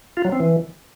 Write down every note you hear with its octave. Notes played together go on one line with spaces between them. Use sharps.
F4
F#3
C4
E3